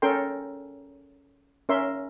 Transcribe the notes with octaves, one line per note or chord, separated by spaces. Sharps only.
C#4 A4 A#4 G5 C6
C#4 A#4 E5 C6